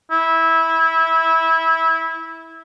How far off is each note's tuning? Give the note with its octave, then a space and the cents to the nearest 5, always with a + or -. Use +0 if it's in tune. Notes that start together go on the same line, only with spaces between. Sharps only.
E4 -15